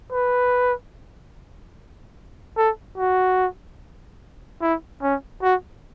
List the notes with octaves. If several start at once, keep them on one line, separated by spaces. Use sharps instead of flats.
B4
A4
F#4
E4
C#4
F#4